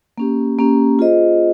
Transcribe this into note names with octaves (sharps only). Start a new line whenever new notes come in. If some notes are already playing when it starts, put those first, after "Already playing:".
A#3 C#4 G4
A#3 C#4 G4
F4 G#4 C5 D#5